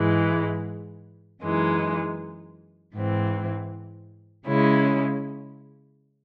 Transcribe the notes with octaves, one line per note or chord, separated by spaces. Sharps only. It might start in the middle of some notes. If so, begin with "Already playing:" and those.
Already playing: G#2 E3 G#3
F#2 E3 G#3 D#4
G#2 E3 C4
C#3 G#3 C#4 E4